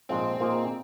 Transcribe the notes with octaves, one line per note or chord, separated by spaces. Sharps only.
A#1 G#2 G#3 C4 F4 C5
A#2 A#3 D#4 G#4 C5